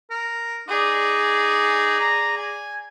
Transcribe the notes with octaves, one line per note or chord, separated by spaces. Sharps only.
A#4
D#4 G#4 D5
A#5
G#5